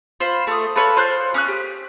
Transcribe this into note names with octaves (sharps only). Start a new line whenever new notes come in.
F4 C5 B5
A3 D#6
F4 A4 B4 C#5
F4 C5 F6 F#6
C#4 D#6 F#6
G4